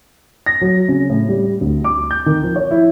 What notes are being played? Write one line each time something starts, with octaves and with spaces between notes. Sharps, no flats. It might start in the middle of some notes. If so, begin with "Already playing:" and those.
A#6
F#3
C#3
A2
G3
D2
D6
G6
D#3
F3
C#5
E4